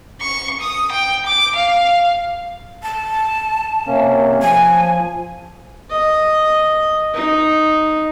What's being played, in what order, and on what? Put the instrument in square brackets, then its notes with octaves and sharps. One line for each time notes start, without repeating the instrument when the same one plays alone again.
[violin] C#6
D#6
G5
D6
F5
[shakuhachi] A5
[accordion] C3 A#3 C#4
[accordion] F3 [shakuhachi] G#5
[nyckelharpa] D#5
D#4